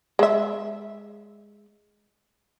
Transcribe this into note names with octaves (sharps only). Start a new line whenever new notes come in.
G#3 E5